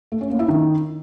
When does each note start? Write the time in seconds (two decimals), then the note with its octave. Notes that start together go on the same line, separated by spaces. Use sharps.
0.12 A3
0.21 C#4
0.30 A#3
0.39 E4
0.48 D#3